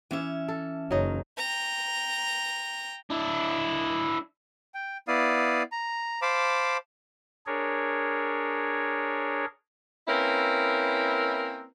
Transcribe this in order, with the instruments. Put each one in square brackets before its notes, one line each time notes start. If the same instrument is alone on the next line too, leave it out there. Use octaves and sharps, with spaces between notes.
[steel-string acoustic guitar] E3 C#4 E5
[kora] A4
[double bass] F#1 [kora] F#3 D#4
[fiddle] G5 A#5
[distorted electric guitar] D4 E4
[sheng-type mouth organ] G5
B3 E4 D5 F5 D#6
A#5
C5 F5 A5 B5 D6
[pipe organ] D4 G#4 A#4 C#5
[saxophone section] A#3 C4 C#4 E4 A#4 B4